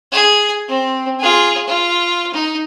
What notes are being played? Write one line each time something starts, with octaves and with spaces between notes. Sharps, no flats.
G#4
C4
F4 G#4
F4
D#4